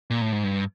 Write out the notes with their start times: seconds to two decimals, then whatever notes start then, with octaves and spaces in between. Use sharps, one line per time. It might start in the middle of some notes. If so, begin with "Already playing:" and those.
0.10 A#2
0.21 A2
0.32 G#2
0.44 G2